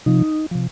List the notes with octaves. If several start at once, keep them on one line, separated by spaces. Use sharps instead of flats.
C3 F3 D#4
C3 F3